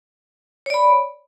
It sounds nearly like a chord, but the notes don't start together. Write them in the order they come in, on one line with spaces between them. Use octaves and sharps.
C#5 D5 B5